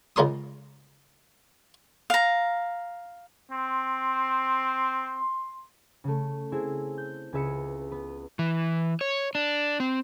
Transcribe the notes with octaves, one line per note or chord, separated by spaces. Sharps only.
C#2 G#3 C#4 A#4 C6 D#6
F5 A#5
C4 C6
C#3 A3
C4 E4 G#4
G6
C#2 G#4 B4 E5 B5 C#7
B3 B4
E3
C#5
D4
C4